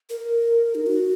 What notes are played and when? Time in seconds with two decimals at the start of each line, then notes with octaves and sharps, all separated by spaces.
0.10 A#4
0.75 D#4
0.86 F#4